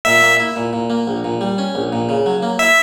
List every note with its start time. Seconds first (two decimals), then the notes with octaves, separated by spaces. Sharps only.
0.05 A#2 E5
0.22 A#3
0.40 E4
0.56 A#2
0.73 A#2
0.90 A#3
1.08 A#1
1.24 A#2
1.41 G3
1.58 C#4
1.75 A#1
1.93 A#2
2.09 C#3
2.26 F#3
2.43 A#3
2.59 E4 E5